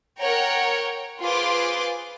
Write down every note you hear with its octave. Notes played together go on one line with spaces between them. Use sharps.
A#4 C#5 F#5 G5 A#5
F4 G#4 B4 C5 C6 D6